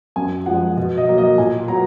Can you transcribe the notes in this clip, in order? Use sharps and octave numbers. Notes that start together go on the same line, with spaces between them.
F#2 G#5
F3 G#3 F#5
B2
D#5
F#3 A#3
D#5
A#2 G#5
F#3 B3 A#5